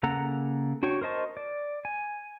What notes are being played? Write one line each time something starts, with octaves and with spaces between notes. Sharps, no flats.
C#3 A#3 A4 F#5 A#5
D4 F#4 C#5 G5 C#6
A#4 C5 D#5 A5 C#6
D5
G#5